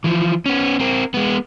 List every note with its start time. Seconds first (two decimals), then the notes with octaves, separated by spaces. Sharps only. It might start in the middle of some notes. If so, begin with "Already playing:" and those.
0.04 E3 F3
0.46 B3 C#4
0.80 C4 A#4
1.14 G#3 B3